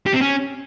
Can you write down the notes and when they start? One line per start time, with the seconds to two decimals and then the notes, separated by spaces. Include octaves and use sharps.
0.06 G4
0.14 C4
0.21 C#4